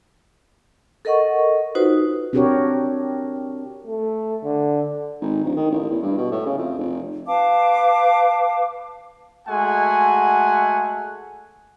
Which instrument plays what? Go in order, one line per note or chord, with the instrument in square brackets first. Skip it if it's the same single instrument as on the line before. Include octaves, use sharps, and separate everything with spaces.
[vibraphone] A4 A#4 D#5 F#5 C#6
D#4 F4 F#4 A4 B4 C5
[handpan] C4 D4 F#4 G4 A#4 C#5
[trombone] A3
D3
[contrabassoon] G#1
D1
D#3
A1
E2
G2
B2
A2
C#3
F2
F1
[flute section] B4 F5 A5 D6
[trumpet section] G#3 A3 F#4 F#5 G#5